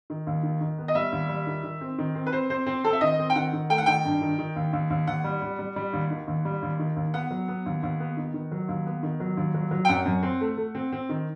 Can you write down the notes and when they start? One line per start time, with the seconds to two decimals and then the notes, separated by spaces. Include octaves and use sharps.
0.10 D#3
0.27 D#2
0.43 D#3
0.61 D#3
0.78 B3
0.88 D#5
0.95 G3 E5
1.12 D#2
1.29 G3
1.47 D#3
1.63 D#3
1.81 C4
1.98 D#3
2.15 C4
2.26 B4
2.32 C4 C5
2.50 C4 C5
2.66 C4 C5
2.84 C4 A4
2.93 E5
3.01 D#3 D#5
3.19 C4
3.30 G5
3.36 D#3 F#5
3.53 D#3
3.69 A3 G5
3.78 F#5
3.86 D#3 G5
4.05 G2
4.21 D#3
4.39 D#3
4.56 D#2
4.73 D#2
4.90 D#2
5.07 D#2 F#5
5.24 G3
5.42 G3
5.59 G3
5.76 G3
5.93 D#2
6.11 D#3
6.28 D#2
6.45 G3
6.62 D#2
6.79 D#3
6.96 D#2
7.14 B3 F#5
7.31 F#3
7.48 B3
7.66 D#2
7.83 D#2
8.00 B3
8.17 D#3
8.34 D#3
8.52 F#3
8.69 D#2
8.86 B3
9.03 D#3
9.20 F#3
9.37 D#2
9.54 F#3
9.71 F#3
9.85 G5
9.89 F#2 F#5
10.06 F#2
10.23 C4
10.41 A3
10.57 A3
10.75 C4
10.92 C4
11.09 D#3